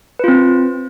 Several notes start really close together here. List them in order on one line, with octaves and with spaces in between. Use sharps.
B4 F4 C4